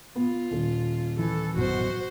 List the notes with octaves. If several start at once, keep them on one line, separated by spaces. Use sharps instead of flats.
B3 F4
D#1
E3 A4
A1 F#2 B2 F#4 C5